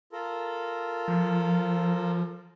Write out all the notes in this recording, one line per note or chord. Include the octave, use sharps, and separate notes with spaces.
F4 A4 A#4
F3